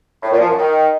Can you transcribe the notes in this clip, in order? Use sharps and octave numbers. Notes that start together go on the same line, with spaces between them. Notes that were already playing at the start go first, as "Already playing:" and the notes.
A2
A#2
F3
F#2
D#3